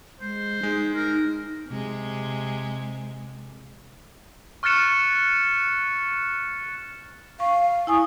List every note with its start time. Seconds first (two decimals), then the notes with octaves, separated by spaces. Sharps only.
0.21 G#3 C5
0.63 G#3 D#4
0.95 D#4 A#4
1.67 C3 G#3
4.63 C#6 F6 F#6 A6 C#7 E7
7.40 F5 C#6
7.87 E4 G#5 C#6 D#6